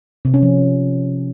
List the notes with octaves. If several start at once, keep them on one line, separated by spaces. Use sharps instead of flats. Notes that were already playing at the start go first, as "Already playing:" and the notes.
C3
C#4
F3